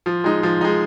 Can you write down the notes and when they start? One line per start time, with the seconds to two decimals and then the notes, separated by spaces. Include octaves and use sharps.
0.06 F3
0.24 G#3 D#4
0.43 F3
0.61 G#3 D#4